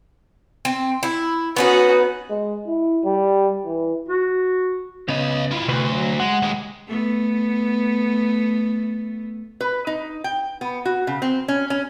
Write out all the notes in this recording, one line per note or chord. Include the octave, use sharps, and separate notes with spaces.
C4
E4
B3 C#4 D#4 F#4 B4
G#3
E4
G3
E3
F#4
C#3 B3 C#5 D#5
E4 F4
D2 C3 B4
F#3
G#3 F#5
D#2 G#3
A3 B3
B4
D#4
G5
B3
F#4
C#3
C4
C#4
C#4